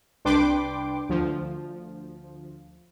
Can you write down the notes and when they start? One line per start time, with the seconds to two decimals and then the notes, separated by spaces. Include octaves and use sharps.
0.25 C2 D4 B4 G5 C6 D6
1.09 D2 F3